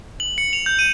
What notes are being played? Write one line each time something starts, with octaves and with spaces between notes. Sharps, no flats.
F#7
C#7
F7
G6
D#7